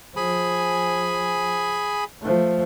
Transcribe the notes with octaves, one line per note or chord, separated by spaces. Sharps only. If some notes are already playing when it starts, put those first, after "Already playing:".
F3 G#4 G#5 B5
F3 A3